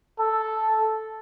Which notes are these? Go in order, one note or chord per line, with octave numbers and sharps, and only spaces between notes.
A4